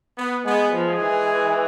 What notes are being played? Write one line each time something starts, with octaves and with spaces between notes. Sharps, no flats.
B3
G#3 B3
F3
G#3 G#4
E3